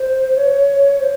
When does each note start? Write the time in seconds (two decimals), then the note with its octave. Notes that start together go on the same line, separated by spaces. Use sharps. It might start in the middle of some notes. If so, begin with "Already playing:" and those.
Already playing: C5
0.37 C#5
0.97 C#5
1.00 C5